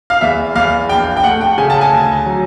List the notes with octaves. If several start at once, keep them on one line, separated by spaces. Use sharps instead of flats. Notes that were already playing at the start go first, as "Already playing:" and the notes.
F5
E2 E5
E2 F5
A#1 G5
G5
A3 F#5
G5
C#3 G#5
A5
G#5
D2
F#3